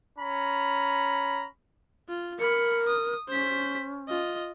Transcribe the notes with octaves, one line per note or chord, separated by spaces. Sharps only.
C#4 A#5 B5
F4
A#4 B5 C#7
D#6
C#4 C5 B6
F4 D#5